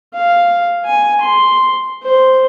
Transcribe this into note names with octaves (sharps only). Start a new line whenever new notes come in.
F5
G#5
C6
C5